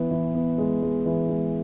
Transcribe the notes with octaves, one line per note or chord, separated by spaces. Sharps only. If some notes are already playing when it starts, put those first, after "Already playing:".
Already playing: E3 B3
E3
B3
G#3
G#3
E3
G#3